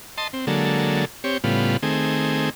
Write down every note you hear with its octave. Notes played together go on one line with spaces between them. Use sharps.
D#5 A5 C6
C4
D3 F#3 G#3 A#3 A4
C4 G4 C#5
A2 C#3 G3 B3 F4
D#3 A3 C4 G#4